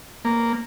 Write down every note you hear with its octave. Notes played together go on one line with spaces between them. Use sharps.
A#3